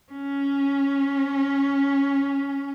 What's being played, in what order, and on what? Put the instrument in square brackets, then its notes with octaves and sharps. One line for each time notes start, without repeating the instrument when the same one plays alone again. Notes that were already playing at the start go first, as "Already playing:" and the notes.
[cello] C#4